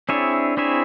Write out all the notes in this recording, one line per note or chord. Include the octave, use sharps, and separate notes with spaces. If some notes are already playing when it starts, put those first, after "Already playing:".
C4 D4 E4 G#4 C#5 E5
C4 E4 G#4 C#5 E5